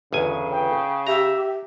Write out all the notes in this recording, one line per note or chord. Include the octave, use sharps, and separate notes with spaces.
G1 E2 C#3 G#5
G5
G4 E5 A#5